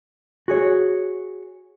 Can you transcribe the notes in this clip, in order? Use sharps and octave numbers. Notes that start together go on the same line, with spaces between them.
F#4 G#4 C#5